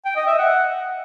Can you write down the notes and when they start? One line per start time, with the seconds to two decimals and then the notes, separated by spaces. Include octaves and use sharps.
0.05 G5
0.16 D#5
0.27 E5
0.38 F#5